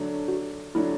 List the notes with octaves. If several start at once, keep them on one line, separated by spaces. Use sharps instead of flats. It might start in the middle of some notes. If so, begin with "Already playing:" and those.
Already playing: D3 F#3 A3 D4
F#4
D3 F#3 A3 D4 E4